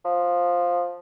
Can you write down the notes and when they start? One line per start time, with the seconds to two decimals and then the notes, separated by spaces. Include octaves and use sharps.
0.05 F3